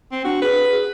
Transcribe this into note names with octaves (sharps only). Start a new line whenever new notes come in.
C4
D4 F#4
G#4 B4
G#4